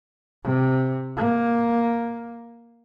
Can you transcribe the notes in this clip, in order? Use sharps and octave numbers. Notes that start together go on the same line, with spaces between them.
C3
A#3